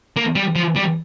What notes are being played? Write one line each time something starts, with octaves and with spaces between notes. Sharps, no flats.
A#3
G3
F3
G3